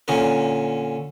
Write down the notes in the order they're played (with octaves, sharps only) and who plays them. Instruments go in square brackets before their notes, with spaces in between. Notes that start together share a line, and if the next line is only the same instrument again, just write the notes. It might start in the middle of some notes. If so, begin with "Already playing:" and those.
[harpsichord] A#2 D3 C#4 A#4